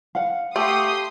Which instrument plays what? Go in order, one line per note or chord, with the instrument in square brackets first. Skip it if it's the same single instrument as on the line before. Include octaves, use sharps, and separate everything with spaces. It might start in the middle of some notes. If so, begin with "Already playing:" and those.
[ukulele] F5 F#5
[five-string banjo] A3 [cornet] G4 [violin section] G5 C6 D#6